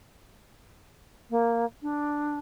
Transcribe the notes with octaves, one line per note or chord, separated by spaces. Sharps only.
A#3
D4